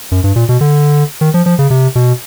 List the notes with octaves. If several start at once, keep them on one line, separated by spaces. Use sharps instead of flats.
F#2
G2
A#2
B2
D3
D#3
F3
F3
C#3
C3
B2